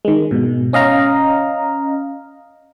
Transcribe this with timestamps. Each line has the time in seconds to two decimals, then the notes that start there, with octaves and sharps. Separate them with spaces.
0.05 D#3 G#3
0.31 G#2 B2
0.73 C#4 D#5 F5 A#5